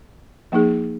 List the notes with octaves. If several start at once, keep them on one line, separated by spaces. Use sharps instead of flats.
F3 A#3 D#4 G#4